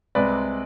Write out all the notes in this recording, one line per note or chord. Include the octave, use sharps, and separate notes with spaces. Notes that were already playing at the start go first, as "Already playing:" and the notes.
C2 C3 G#3 C4 B4 D5